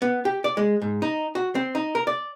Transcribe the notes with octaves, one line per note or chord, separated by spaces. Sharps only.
B3
G4
D5
G#3
G#2
D#4
F#4
C4
D#4
A#4
D5